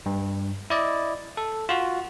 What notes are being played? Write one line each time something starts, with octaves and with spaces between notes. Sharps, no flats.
G2
E4 D5 D#5
A4
F4 F#4